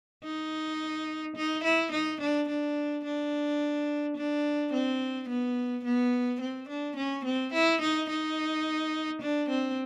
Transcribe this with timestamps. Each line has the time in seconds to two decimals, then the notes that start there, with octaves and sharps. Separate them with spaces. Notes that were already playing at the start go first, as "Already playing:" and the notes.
0.24 D#4
1.36 D#4
1.64 E4
1.92 D#4
2.21 D4
2.48 D4
3.05 D4
4.17 D4
4.73 C4
5.29 B3
5.85 B3
6.41 C4
6.69 D4
6.96 C#4
7.25 C4
7.53 E4
7.81 D#4
8.10 D#4
9.22 D4
9.49 C4